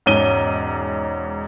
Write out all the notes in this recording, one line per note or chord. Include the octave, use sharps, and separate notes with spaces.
E1 G#2 C#4 D#7 G7